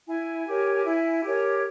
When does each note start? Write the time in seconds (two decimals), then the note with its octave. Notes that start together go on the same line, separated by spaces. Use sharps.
0.06 E4 G#5
0.46 G4 A#4 C#5
0.84 E4
1.23 G4 A#4 C#5